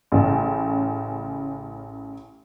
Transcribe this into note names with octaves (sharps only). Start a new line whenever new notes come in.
A1 C#3